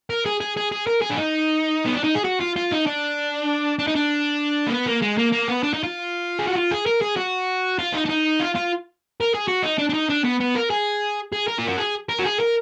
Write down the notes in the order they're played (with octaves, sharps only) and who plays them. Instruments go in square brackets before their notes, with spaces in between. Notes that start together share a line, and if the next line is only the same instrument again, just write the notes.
[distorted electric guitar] A#4
G#4
G#4
G#4
G#4
A#4
G#4
D4
D#4
B3
D4
D#4
G#4
F#4
F4
F4
D#4
D4
D4
D#4
D4
A#3
B3
A#3
G#3
A#3
A#3
B3
D4
D#4
F4
G#4
F#4
F4
G#4
A#4
G#4
F#4
F4
D#4
D4
D#4
F4
F4
A#4
G#4
F#4
D#4
D4
D4
D#4
D4
B3
B3
A#4
G#4
G#4
A#4
F4
F#4
G#4
A#4
F#4
G#4
A#4